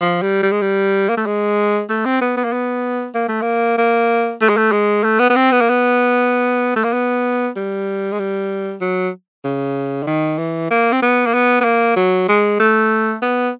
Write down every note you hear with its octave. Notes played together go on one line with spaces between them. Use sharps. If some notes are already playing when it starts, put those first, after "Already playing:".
F3
G3
G3
G#3
G3
A#3
A3
G#3
A3
C4
B3
B3
A#3
B3
A#3
A3
A#3
A#3
A3
G#3
A3
G#3
A3
B3
B3
C4
B3
A#3
B3
A3
A#3
B3
G3
G#3
G3
F#3
C#3
D3
D#3
E3
A#3
C4
B3
A#3
B3
B3
A#3
F#3
G#3
A3
B3